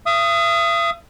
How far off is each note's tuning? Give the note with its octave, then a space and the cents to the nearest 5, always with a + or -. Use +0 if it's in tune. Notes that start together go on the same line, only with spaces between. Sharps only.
E5 +45 D#6 +0